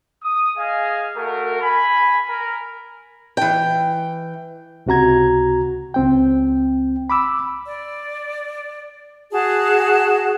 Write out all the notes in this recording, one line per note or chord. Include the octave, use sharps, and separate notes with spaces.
D#6
G#4 D#5 F5 G#5
A3 F#4 A#4
G#5 B5
A#4
E3 G5
C#2 C3 F#4 A#5 G#6
C#2 C4 G5
B5 D6 E6
D5
F#4 G#4 A5